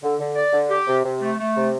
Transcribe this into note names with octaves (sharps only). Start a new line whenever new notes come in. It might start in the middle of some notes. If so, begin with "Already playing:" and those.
D3
D3
D5
D3
G4
C3
C3
A3
A3
C3